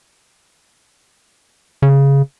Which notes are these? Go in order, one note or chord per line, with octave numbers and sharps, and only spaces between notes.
C#3